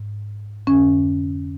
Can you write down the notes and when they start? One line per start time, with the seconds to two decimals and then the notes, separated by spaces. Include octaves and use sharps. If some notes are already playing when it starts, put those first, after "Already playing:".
Already playing: G#2
0.67 F2 D3 C#4